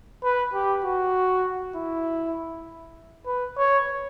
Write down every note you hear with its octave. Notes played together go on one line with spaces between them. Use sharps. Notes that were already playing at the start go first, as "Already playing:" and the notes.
B4
G4
F#4
E4
B4
C#5